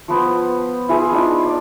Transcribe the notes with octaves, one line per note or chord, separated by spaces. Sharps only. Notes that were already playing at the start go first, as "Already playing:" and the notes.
F3 B3 C5
E4 F4 G#4 G#5
D4 D#4 F4
D5